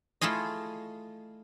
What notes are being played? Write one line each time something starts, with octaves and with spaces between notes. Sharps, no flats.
A3 E4 F4 G#4 D#5